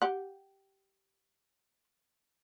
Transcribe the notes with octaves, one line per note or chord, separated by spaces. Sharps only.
G4 F#5